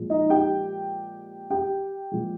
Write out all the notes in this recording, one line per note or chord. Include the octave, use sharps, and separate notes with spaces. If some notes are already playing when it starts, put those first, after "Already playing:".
Already playing: A#2 F3 G#3
D#4 D#5
G4 G5
G4 G5
A#2 F3 G#3